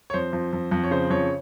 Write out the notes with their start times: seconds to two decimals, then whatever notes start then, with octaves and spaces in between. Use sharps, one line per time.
0.10 C#5
0.14 F2 C5
0.33 F2
0.53 F2
0.71 F2
0.84 C#5
0.91 C#3 C5
1.10 F2 C#5